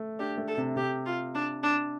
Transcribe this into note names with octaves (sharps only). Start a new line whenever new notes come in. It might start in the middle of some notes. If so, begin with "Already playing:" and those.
Already playing: A3
D4 G4
A3
A4
C3
C3 G4
F4
D4
D4